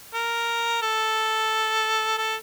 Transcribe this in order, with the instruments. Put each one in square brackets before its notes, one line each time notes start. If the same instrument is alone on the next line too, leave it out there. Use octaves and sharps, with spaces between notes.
[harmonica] A#4
A4
A4